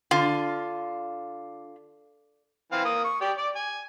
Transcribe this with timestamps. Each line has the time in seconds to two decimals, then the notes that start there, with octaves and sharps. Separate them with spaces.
0.11 D3 F4
2.72 E3 C4 F5
2.85 A#3 D#6
3.04 C#6
3.21 G4 D5 G5
3.38 D5 D6
3.56 G#5